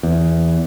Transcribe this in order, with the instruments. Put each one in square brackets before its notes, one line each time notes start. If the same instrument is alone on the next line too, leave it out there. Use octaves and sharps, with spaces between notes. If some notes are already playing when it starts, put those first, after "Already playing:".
[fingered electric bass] E2